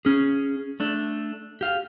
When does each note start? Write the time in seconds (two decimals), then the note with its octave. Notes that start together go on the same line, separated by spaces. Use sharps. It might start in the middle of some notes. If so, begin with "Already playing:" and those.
0.05 C#4 G#4
0.80 A3 D4
1.61 G4 F5